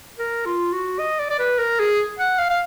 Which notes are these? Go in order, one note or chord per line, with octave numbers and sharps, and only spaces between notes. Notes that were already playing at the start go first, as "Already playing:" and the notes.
A#4
F4
F#4
D#5
D5
D5
B4
A#4
G#4
F#5
F5
F5